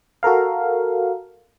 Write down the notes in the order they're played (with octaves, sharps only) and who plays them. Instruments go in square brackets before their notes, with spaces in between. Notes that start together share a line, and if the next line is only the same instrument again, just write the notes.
[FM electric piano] F#4 A4 A#4 F5